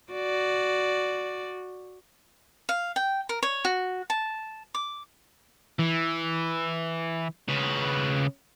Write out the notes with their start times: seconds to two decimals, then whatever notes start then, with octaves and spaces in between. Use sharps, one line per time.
0.13 F#4 D5
2.69 F5
2.96 G5
3.29 A#4
3.43 C#5
3.65 F#4
4.10 A5
4.74 D6
5.79 E3
7.48 C#3 B4